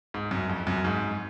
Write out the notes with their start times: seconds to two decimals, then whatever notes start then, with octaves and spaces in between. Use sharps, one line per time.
0.14 G#2
0.31 F#2
0.49 F2
0.67 F#2
0.84 G#2